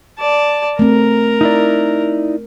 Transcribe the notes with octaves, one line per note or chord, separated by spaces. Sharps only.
D5 A5
A3 C4 A#4 A#5
D#4 E4 D5